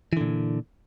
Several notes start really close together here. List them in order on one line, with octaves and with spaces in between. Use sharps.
E3 D3 A#2